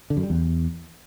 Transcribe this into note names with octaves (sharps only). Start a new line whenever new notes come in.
D3
F#2
G3
E2